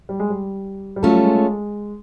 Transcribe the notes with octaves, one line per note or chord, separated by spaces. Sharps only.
G3
G#3
G3
G3
F#3 A3 C#4 F4 A4
G3
G#3
G#3